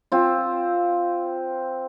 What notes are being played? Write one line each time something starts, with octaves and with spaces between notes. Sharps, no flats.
C4 F4